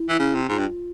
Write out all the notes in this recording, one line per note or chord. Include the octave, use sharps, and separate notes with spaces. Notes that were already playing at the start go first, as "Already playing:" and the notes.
Already playing: E4
E3
C#3
C3
G#2 F4
G2